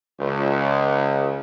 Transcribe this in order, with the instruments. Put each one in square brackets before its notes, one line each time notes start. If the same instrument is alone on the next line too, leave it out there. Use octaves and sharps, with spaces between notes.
[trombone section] C#2